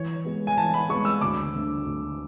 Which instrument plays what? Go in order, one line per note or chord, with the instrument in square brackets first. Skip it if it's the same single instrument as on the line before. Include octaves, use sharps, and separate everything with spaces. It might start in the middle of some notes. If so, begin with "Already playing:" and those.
Already playing: [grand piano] E3 [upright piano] C#5
[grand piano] G#3 B3
[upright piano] G#5
[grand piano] E3 [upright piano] A5
[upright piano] B5
[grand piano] G#3 B3 [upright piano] C#6
[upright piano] E6
[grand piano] D2 [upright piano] D6
[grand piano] D3 A3
D2